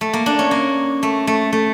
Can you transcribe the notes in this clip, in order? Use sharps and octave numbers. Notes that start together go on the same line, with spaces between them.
A3
A#3
D4
C#4
A#3
A3
A3
A3